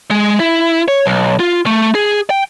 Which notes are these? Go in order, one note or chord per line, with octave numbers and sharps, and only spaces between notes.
G#3
E4
C#5
B1
F4
A3
G#4
G5